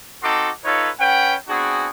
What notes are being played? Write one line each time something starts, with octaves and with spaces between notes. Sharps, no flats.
C4 D#4 F#4 A4 C6 D6
D#4 F4 A4 B4 C#5
C#4 B4 F#5 G5
B3 C4 D4 F#4 G#4